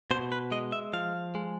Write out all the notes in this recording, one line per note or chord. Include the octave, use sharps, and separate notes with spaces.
B2 C5
B4
G#3 D#5
E5
F3 F5
G#3